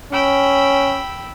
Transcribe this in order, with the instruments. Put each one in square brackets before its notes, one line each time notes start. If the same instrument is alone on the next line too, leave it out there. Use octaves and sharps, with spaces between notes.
[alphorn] C#4 [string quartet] G5 B5 E6